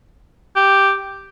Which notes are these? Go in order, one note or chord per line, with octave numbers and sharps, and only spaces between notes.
G4